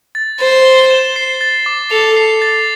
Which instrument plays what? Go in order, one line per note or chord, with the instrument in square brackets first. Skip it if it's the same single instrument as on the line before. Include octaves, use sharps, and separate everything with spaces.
[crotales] A6
[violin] C5 [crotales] A6
[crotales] G7
E7
C7
A6
D6
[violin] A4 [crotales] F7
[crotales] C7
A6